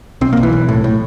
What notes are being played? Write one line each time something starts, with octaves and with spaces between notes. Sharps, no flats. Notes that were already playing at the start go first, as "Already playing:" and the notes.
B1 C4
A#3
B1
E3
B1
A2
A2